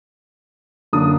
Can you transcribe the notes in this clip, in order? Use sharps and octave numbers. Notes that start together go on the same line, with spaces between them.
F#2 D3 F#3 A#3 D4 D#6